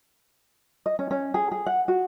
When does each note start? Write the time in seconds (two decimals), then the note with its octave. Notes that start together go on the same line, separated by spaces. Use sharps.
0.86 D#5
0.99 C#4
1.11 C#4
1.34 G#4
1.52 G#4
1.66 F#5
1.88 F#4